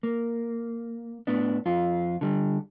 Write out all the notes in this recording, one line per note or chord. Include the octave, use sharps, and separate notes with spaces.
A#3
A2 B3 D4
F2 F4
D3 G3